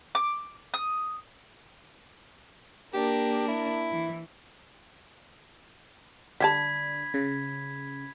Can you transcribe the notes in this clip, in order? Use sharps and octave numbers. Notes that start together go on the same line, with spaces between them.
D6
D#6
A#3 D4 G4 A#4
E4
E3
D3 G3 D4 G4 A5 B5 G#6 B6
C#3